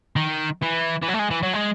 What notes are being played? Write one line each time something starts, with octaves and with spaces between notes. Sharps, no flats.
D#3
E3
E3
F#3
A3
G#3
E3
F#3
G#3